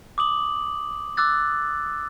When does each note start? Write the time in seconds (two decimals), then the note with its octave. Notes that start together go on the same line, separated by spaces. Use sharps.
0.18 D6 D#6 F#7
1.17 D6 E6 F#6 A6